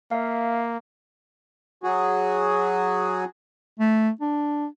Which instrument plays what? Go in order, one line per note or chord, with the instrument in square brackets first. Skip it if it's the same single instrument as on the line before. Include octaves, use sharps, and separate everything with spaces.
[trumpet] A#3 [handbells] E5 F5
[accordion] F#3 F#4 G#4
[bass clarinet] A3
D4